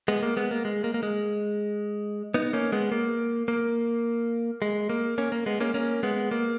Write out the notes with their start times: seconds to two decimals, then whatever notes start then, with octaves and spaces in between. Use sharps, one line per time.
0.08 G#3 B3
0.23 A#3
0.37 G#3 B3
0.51 A#3
0.65 G#3
0.84 A#3
0.94 A#3
1.03 G#3
2.34 B3 D#4
2.53 A#3 C#4
2.72 G#3 B3
2.92 A#3
3.48 A#3
4.62 G#3
4.90 A#3
5.18 A#3 C#4
5.32 A#3
5.46 G#3 B3
5.60 A#3 C#4
5.74 A#3 C#4
6.03 G#3 B3
6.31 A#3